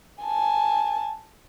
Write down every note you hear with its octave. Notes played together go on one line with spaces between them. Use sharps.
G#5 A5